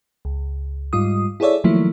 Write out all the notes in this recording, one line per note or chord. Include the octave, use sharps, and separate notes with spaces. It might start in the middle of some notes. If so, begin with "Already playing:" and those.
C#2
G#2 G3 F4 D#6
E4 G#4 A4 C#5 D5 E5
D#3 F3 F#3 A3 A#3 E4